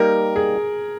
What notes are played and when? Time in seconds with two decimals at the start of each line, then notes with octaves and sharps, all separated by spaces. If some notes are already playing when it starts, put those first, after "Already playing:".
Already playing: G3 A#3 D#4 G4 A#4
0.36 G#4